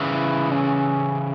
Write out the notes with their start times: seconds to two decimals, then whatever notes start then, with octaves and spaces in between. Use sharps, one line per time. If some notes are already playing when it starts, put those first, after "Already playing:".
Already playing: C#3 E3
0.13 E4
0.52 C#4